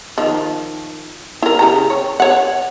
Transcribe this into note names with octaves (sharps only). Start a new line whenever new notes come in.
D#3 F3
E4 A#4
C#3 G4 A#5
C#5
C#5 F#5